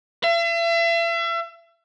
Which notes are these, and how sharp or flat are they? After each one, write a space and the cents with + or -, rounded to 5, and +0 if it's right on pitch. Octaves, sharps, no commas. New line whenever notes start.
E5 +40